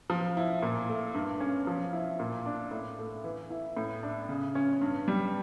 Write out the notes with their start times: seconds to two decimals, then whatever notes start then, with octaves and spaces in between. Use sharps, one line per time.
0.10 F3
0.37 E4
0.62 A#2
0.89 A3
1.14 G2
1.40 C#4
1.67 F3
1.93 E4
2.20 A#2
2.46 D4
2.71 A2
2.98 A3
3.24 E3
3.50 E4
3.77 A2
4.03 D4
4.29 C#3
4.55 C#4
4.81 G2
5.08 G3